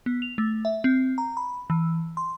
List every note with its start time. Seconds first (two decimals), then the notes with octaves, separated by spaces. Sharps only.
0.06 B3
0.22 F7
0.38 A3
0.65 E5
0.84 C4
1.18 A#5
1.37 B5
1.70 E3
2.17 C6